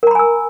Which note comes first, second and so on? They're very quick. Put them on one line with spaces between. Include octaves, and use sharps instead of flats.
A#4 A#5 B5 G#5 E6